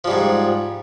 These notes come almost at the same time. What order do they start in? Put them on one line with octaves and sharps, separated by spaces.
F3 G3 G#2